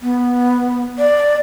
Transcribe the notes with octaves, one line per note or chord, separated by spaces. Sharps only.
B3
D5